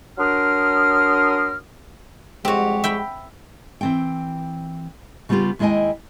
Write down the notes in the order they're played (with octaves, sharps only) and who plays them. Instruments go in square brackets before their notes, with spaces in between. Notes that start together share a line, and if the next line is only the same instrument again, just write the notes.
[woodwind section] F#3 D4 A#4 C6 D#6 F6
[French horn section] F2 G3 G#3 [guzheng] C4 F#4 [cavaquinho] G4 C#5
[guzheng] E5 G5 B5
[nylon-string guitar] E3 C4 G5
C#3 G3 B3 D4 F4 G4
D#2 G#3 E4 D#5 G5 G#5